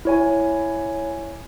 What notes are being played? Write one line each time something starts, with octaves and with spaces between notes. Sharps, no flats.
E4 C#5 G#5